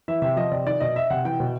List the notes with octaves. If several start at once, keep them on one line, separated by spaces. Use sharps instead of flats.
E3 E5
C3 E5
F3 D#5
C3 D5
D#3 D5
B2 D#5
E5
C3 F#5
E3 G5
B2